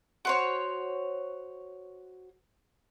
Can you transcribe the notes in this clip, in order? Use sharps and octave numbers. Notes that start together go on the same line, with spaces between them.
F#4 C5 C#5